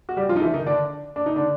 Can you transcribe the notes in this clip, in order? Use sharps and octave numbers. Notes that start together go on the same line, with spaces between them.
F#4
G3 G4
F3 F4
D#4
E3 E4
D#3 D#4
D3 D4
D4
D#4
D3 D4